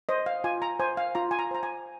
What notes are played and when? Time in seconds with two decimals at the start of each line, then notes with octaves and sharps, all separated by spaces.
0.09 C5 D#5
0.26 F5
0.44 F4 G#5
0.62 A#5
0.80 C5 G#5
0.97 F5
1.15 F4 A#5
1.31 G#5
1.39 A#5
1.51 C5 A#5
1.63 G#5